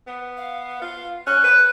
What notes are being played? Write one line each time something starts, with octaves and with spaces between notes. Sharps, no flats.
B3
F5
F4
C#4 F#6
B4